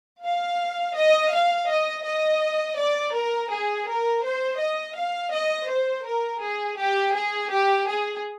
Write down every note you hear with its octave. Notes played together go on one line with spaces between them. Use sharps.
F5
D#5
F5
D#5
D#5
D5
A#4
G#4
A#4
C5
D#5
F5
D#5
C5
A#4
G#4
G4
G#4
G4
G#4